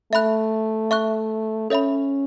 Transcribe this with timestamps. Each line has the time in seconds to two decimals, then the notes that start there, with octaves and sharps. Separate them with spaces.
0.12 A3 E5 B5 F#6
0.91 E5 C#6 F#6
1.70 C#4 A4 C#5 E5 B5